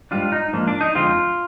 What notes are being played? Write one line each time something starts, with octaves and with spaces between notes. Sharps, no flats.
G#2 G3 D4 F4
D#4
G#2 F3 A#3 D4
D4
D#4
F2 D3 F3 G#3 C4 F4